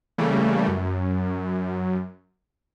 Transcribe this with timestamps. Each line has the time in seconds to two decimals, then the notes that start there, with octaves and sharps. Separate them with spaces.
0.18 C#3 E3 G3 A3 A#3
0.68 F#2